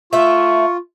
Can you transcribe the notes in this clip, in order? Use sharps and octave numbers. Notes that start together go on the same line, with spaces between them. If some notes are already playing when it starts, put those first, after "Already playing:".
A3 F4 E5 C#6